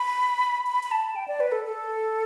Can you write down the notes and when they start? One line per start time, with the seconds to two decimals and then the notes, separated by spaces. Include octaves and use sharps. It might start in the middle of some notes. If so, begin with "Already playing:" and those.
Already playing: B5
0.67 B5
0.83 B5
0.91 A5
1.16 G5
1.28 D5
1.40 B4
1.52 A4
1.64 A4